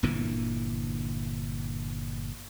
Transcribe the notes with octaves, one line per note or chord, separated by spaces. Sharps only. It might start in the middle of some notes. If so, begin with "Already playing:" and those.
G1 A#2 D3 E3